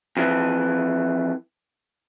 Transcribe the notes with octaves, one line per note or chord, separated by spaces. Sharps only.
F2 E3